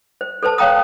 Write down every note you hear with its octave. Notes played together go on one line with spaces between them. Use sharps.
C5
A4 B4 C5 A5
C#5 F5 G5 A#5 D#6